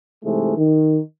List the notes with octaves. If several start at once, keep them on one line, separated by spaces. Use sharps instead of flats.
G#2 C3 E3 G#3 A3
D#3